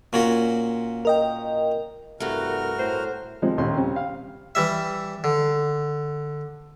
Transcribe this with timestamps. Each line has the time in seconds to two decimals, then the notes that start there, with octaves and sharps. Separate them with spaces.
0.13 A#2 C#4 F#4
1.05 A#4 D#5 G5
2.20 C2 G2 A3 F#4 A#4 F6
2.79 A2 C5
3.42 C3 F3 G3 G#3 C4 D#4
3.58 A1 D#2 A#2 C6
3.77 C#3 G3 C4
3.96 F5
4.55 E3 G3 E5
5.24 D3